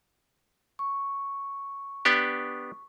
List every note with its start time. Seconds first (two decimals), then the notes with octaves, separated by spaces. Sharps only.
0.79 C#6
2.05 B3 D4 G4